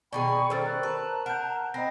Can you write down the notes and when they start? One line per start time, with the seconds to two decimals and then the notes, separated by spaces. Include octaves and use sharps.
0.13 B2 D#3 G#4 D5 G5 B5 C#6
0.50 D#3 G3 C#4 A4 C5 E6 A6
0.66 A#4 C#6 F#6
0.83 B4 A5 A#5
1.26 A#4 F#5 G6
1.74 C4 D#5 B5 A#6